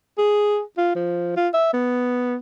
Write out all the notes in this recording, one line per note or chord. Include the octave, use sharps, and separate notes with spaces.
G#4
F4
F3
F4
E5
B3